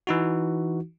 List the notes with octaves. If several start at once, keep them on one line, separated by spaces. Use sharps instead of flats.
E3 D#4 F#4